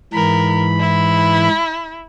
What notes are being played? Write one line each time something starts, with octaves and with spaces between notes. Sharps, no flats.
G#2 E3 A#4 B5
E4